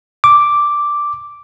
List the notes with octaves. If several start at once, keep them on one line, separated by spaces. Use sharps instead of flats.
D6